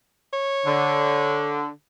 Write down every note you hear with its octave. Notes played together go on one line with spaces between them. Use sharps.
C#5
D3